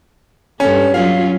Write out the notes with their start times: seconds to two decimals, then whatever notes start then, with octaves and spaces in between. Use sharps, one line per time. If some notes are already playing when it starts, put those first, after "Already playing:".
0.60 G2 C#4 A4
0.94 F#3 C#4 F4 F5